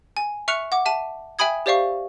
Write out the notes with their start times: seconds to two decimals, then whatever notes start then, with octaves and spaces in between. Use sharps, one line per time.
0.17 G#5
0.48 E5 C#6 F6 F#6 C#7 F7
0.72 F#5 D6
0.86 E5 A5 D#7
1.39 E5 G5 G#5 B5 D#6 G#6
1.66 G4 C5 D5 E5 F5 C#6